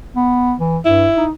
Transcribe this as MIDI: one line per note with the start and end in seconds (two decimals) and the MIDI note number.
0.16 0.54 59
0.60 0.78 52
0.86 1.07 43
0.86 1.24 64
1.17 1.31 63